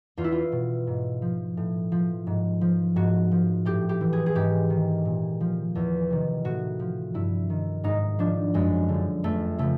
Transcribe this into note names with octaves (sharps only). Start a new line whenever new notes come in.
E2 F4
E4
F4
B2
G#2
F3
A2
F3
G#2
F3
G#2 F#4
F3
A2 G4
G4
E3
G#4
G#4
G#2 G4
D#3
A#2
F3
E2
C3 D#3
A2 F#4
F3
G2 E4
D#3
G#2 D#4
F3 D4
F#2 G#3
D3
F3
F2 A3
C#3 F3 A3